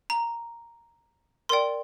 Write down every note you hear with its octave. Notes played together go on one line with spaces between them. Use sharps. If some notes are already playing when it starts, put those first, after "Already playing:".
A#5
A#4 D5 G5 C6